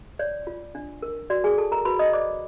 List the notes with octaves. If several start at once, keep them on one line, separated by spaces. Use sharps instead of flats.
C#5 D5
F4
D4
A#4
F#4 D5
G#4 G#5
A4 A5
A#4 A#5
F#4 B4 B5
D#5 D#6
C5 D5 D6